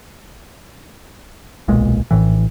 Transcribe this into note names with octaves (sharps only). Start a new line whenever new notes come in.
D1 B1 A#2 G#3
A#1 A2 E3